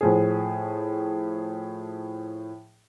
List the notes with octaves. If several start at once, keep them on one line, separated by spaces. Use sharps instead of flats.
A2 F3 G#4